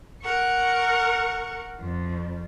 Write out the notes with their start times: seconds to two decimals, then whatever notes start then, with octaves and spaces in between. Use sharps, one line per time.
0.22 A#4 F#5 C#6
1.79 F2